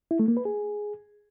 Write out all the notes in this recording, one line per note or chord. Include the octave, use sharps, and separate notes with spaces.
E4
A3
A#3
B4
G#4